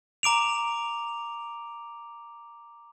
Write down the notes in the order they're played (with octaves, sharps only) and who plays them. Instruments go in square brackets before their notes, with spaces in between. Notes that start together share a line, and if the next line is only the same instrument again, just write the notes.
[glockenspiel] A#5 D6 D7 F7